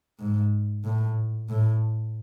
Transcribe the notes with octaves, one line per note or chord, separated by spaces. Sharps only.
G#2
A2
A2